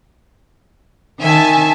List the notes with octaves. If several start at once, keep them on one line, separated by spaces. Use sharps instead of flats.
D#3 E5 G#5 A5